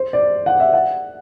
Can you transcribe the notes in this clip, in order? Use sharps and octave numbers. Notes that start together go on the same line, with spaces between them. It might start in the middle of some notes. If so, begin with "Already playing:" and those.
Already playing: C5
D5
F#5
E5
F#5